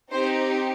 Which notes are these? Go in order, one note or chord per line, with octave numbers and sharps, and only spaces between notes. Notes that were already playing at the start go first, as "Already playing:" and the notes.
C4 D#4 G4 C5